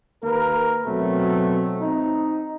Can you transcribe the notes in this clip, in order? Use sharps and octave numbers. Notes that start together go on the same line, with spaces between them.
D#2 A#3 A#4 B4
B2 F#3 A3 C4
C4 D#4